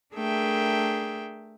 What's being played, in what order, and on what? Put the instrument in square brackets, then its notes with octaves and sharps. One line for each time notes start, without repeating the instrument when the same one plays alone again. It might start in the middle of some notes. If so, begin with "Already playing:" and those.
[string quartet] A3 D4 G#4 A#4 E5 G5